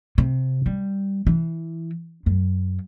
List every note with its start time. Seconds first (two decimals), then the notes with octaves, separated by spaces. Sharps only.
0.18 C3
0.66 G3
1.27 E3
2.26 F#2